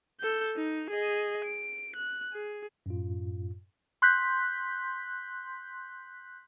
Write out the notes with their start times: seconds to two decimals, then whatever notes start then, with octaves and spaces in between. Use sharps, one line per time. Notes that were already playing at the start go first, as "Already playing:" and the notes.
0.20 A4 G6
0.56 D#4
0.90 G#4 D#5
1.44 D7
1.96 F#6
2.33 G#4
2.86 F#2 A2 F4
4.02 C6 F#6 G6 B6